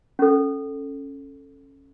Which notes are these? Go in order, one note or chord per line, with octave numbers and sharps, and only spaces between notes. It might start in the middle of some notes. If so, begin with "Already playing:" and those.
C#4 A4